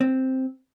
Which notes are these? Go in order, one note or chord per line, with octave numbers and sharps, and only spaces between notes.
C4